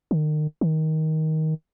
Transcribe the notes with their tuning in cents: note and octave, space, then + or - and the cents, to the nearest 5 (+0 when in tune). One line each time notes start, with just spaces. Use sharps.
D#3 -35
D#3 +15